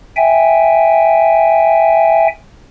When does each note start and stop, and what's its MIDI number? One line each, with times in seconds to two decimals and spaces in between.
0.17 2.28 76
0.17 2.28 79
0.17 2.28 80